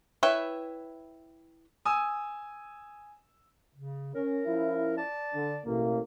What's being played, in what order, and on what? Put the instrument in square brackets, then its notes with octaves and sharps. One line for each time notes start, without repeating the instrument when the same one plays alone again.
[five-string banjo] E4 B4 C#5 E5 G5
[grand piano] G#5 D#6 E6
[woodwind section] C#3
[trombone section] C#4 [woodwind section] A#4
[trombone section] F3 C#4 E4
[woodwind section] D5 A5
[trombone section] D3
[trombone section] A1 A#3 [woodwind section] B2